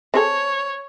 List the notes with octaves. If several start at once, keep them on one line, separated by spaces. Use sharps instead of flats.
C4 G#4 A4 C#5